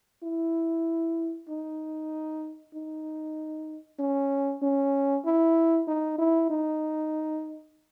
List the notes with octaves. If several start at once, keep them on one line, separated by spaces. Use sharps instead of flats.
E4
D#4
D#4
C#4
C#4
E4
D#4
E4
D#4